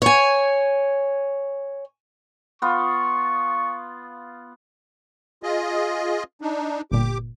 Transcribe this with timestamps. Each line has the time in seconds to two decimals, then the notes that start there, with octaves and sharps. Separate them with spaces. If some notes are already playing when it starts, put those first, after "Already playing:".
0.02 C#5 G#5
2.62 B3 F4 C#6
5.43 F4 G#4 D#5
6.41 D4 D#4
6.92 G1 A#2 G4 D6